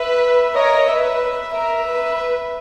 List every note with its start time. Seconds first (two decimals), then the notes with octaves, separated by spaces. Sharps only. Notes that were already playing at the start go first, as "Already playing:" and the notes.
Already playing: B4 E5
0.54 A#4 C#5 D#5
0.88 B4 E5
1.54 A#4 E5
1.86 B4